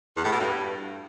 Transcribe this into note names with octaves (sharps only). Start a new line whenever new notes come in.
E2
A2
B2
G2